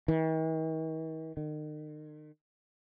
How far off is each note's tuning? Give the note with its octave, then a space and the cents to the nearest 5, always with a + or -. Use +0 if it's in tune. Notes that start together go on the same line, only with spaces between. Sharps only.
D#3 +45
D#3 -35